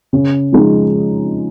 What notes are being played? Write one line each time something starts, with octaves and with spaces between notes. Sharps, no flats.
C#3
F3 G#3 D#4